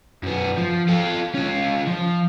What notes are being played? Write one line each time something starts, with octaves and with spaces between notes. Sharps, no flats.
F#2 B3
F3
F4 A4
C#4 F4
F3